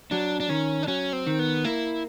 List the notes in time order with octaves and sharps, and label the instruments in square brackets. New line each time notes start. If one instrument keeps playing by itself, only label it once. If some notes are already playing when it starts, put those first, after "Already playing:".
[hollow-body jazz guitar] F#3 [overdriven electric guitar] D4
[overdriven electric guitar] D4
[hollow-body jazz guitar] D#3 [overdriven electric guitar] C#4
[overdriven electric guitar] D4
[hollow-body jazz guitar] F#3 [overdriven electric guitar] C#4
[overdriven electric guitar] C4
[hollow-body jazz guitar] D#3
[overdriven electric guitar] B3
[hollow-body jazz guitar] A#3 [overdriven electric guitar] E4